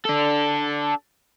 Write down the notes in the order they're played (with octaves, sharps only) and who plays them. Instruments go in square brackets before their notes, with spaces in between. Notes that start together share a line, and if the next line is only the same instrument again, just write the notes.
[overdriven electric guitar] D4 A4